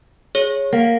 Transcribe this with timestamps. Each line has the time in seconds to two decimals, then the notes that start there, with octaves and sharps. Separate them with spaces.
0.35 G#4 C#5
0.73 A#3 F#5